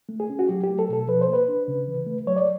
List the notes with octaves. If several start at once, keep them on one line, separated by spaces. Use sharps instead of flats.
A3
G#4
C#4
F#4
F#3 G4
G4
A3
A4
B2 A4
F3 B4
C5
A#3
B4
D4
C#3
E3
A3
F#3 C#5
D5